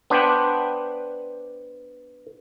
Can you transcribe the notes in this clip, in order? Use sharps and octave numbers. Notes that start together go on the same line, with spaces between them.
B3 D4 B4 C5 F#5 G5